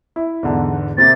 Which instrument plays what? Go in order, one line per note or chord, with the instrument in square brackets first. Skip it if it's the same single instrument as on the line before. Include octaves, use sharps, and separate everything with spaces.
[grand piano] E4
E2 G#2 D3
[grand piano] C3 A#3 C4 [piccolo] A6